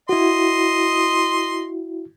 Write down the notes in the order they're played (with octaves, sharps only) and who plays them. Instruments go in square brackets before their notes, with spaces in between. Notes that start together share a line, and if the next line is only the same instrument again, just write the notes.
[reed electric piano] E4 F#4 [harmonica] D#5 C6